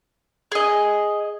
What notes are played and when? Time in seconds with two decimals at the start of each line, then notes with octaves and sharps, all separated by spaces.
0.52 G#4 D#5